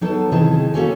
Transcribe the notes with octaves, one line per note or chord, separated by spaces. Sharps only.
F#3 B3 D#4 A4 A5
C3 D#3 E3 D#4 G#4 A5
A#3 C#4 F#4 A4 C#5 G#5